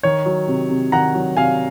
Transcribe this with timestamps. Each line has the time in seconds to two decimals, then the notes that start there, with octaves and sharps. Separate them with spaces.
0.03 D#3 C#5
0.26 F#3
0.48 C3
0.70 C3
0.92 D#3 F#5 A#5
1.15 F#3
1.37 C3 F5 G#5